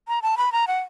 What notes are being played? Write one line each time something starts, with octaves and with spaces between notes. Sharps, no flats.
A#5
A5
B5
A#5
F#5